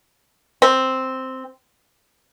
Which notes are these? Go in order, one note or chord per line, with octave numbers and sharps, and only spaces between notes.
C4